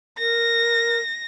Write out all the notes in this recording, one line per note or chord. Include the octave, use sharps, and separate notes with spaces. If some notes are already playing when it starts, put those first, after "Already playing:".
A#4 A#6